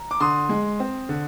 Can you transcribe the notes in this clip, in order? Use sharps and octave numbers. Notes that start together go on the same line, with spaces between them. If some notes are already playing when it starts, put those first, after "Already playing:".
Already playing: A#5
D6
D3 C6 D#6
G#3
C4
D3